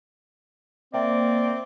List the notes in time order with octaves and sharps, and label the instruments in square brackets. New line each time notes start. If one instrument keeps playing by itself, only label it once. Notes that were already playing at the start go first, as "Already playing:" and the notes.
[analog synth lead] A#3 [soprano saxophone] C4 [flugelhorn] D5 [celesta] E5 G5